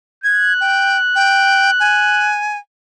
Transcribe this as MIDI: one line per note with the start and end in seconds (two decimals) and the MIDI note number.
0.24 2.38 90
0.24 0.53 92
0.61 0.98 79
1.16 1.71 79
1.80 2.57 80